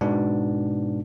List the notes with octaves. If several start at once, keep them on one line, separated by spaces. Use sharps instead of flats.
G#2 B2 B3 D4